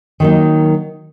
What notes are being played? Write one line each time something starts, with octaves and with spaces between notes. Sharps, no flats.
D#3 F#3 A#3 D#4